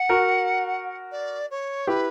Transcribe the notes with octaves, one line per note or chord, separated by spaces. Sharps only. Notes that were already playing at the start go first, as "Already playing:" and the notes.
Already playing: F#5
F#4 A#4
D5
C#5
E4 G4 B4